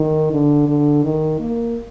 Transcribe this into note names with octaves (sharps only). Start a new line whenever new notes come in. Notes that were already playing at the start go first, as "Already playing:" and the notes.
Already playing: D#3
D3
D3
D#3
A#3